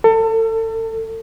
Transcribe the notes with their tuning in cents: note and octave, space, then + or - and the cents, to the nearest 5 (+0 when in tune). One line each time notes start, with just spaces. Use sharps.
A4 +30